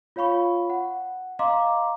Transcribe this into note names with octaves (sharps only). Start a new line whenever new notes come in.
F4 C#5 F5 B5 C#6
F#5
D#5 F5 A#5 C6 D6